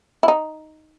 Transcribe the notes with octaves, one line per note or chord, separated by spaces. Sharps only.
E4
D#4